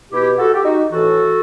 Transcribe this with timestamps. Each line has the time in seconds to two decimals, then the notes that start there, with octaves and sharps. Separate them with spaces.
0.13 B2 E4 G4
0.38 F#4 A4
0.54 G4
0.64 D#4 F#4
0.90 A2 E3 F#4 A4